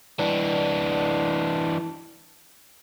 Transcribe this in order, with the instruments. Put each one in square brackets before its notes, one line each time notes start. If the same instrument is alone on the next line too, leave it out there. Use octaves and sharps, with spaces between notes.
[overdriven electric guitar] E3 D4